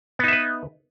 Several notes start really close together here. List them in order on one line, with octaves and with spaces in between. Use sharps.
B3 D#4 E5 B4